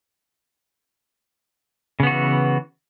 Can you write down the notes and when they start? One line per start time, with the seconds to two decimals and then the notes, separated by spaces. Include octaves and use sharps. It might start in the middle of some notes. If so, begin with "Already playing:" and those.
2.00 C#3
2.03 B3
2.07 F#4
2.10 E3